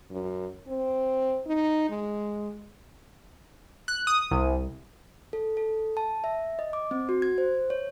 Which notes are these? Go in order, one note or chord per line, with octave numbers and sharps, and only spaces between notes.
F#2
C4
D#4
G#3
F#6
D#6
C2
A4
A4
A5
E5
D#5
D6
C4
F#4
G#6
C5
C#5